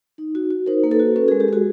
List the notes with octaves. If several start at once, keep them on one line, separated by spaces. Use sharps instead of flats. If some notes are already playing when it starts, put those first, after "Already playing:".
D#4
F#4
F#4
D#4 A#4 C5
A#3
A4 B4
F#4
C#4 A4 B4
G#4 A#4
G#3
G4 A4
G#3 F#4 G#4